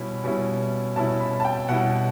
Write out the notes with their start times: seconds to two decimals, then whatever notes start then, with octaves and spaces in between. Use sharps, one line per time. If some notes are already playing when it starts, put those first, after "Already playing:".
Already playing: B2 G3 C#4 E4 B5
0.24 B2 G3 C#4 E4
0.96 B2 G3 C#4 E4 A5
1.20 B5
1.40 A5
1.45 G5
1.68 B2 G3 C#4 E4 F#5